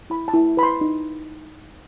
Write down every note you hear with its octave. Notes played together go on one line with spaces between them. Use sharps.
E4 B5
A5
E4
B4 B5
C6
D#4